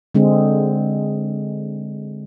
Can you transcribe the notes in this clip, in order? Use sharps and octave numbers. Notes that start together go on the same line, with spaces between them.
D3 G#3 C4